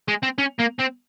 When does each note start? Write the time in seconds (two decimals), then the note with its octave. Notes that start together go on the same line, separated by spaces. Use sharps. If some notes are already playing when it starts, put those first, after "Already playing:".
0.08 G#3
0.23 C4
0.38 C#4
0.59 A#3
0.79 C4